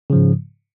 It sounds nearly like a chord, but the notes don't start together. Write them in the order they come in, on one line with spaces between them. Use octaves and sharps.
C#3 F3 G#2